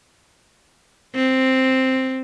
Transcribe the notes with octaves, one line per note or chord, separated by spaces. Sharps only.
C4